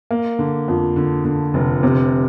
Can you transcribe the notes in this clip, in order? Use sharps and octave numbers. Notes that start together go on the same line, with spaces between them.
A#3
D3
F2
D3
D3
F1
C3